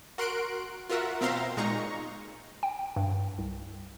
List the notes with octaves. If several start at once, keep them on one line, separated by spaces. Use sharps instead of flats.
F#4 A#4 C6 F#6 D7
F4 F#4 A#4 E5 F#5
B2 C4 E5 F5 A#5 C6
A#2 G#3 D#4 A#5 C#6
G5
G2
C2